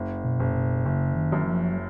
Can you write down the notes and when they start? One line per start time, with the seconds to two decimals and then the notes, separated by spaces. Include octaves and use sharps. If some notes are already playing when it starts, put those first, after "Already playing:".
Already playing: F#1
0.24 B2
0.40 F#1
0.55 B2
0.86 F#1 C#3
1.16 D#3
1.32 F#2
1.47 F3
1.72 F#3